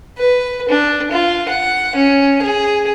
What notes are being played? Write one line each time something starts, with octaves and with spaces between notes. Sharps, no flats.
B4
D4
F4
F#5
C#4
G#4